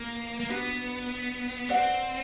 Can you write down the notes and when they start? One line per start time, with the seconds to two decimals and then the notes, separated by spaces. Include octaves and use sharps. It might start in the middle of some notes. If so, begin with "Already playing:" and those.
Already playing: A#3
0.40 A#3
0.49 B3 D4 F#4 B4
1.69 C4 B4 D5 F#5